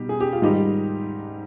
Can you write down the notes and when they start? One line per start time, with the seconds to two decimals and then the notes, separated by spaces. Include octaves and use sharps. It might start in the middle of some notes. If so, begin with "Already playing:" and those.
Already playing: B2 G3 D#4 G4
0.09 G#4
0.20 G4
0.33 F4
0.42 G#2 D#3 G3 D#4 G4